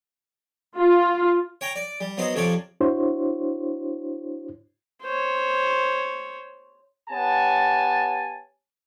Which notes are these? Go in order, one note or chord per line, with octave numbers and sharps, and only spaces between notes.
F4
C#5 G5 A#5
D5
G3
F#3 B3 D#4 C5
F2 C3 F3 C#5 D5
D4 E4 F#4 C5 C#5
C5 C#5
B3 G4 C#5 G#5 A5